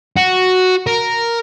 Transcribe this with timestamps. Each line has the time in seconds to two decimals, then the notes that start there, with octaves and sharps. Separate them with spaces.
0.17 F#4
0.87 A#4